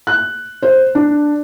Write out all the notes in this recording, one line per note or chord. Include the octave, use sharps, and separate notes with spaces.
F#6
C5
D4